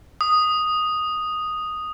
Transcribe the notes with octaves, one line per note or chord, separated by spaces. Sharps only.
D#6